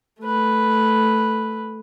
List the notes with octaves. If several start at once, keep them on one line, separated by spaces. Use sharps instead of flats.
A3 B4